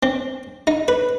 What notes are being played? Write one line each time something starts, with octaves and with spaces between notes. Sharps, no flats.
C4
D#4
B4